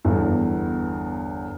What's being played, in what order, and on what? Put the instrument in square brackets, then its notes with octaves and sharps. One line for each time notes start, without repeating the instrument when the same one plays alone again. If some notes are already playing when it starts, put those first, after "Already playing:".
[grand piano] G1 E2